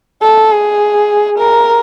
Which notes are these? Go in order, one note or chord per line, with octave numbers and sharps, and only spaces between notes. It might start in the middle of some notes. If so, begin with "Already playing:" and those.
A4
G#4
A#4